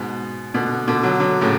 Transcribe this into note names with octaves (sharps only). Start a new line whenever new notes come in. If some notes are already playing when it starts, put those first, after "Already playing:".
Already playing: G#2 B2
B2 D3
B2 D3
D3 F#3
D3 F#3
A2 C#3